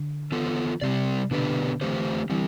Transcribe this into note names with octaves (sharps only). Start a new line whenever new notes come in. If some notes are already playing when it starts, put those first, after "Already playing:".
Already playing: D3
E3 B3 F4 A4
C3 G3 C4 G4 D5
B2 D3 B3 D4 G4 B4
E3 A3 C4 G4 C5
E3 G3 C4 G4